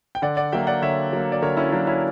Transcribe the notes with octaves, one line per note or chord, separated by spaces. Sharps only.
G5
D3 D5 F#5
D5 F#5
F#3 A#3 E5 G5
D5 F#5
D3 C#5 E5
F#3 A#3
D5
D3 A#4 C#5
C#4 E4
F#3 A#3 D4
C#4 E4